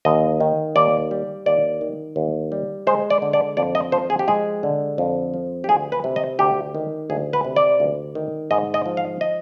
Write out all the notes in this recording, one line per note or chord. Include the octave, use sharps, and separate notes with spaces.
D#2 D#5
D#3
D#2 D5
G3
D#2 D5
D#3
D#2
G3
G#3 C5
D5
D3
D5
F2 D5
D#5
F3 C5
G#4
G4
G#3 G#4
D3
F2
F3
G4
D2 G#4
B4
C3
D#5
D2 G4
D#3
D2 G#4
B4
C3
D5
D2
D#3
G#2 D#5
D#5
F3
F5
D#5